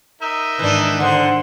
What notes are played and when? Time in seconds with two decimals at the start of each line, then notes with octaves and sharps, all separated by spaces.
0.22 D#4 A#4 E5
0.59 G#2 D#3 E3 D4
1.00 D3 C5 F#5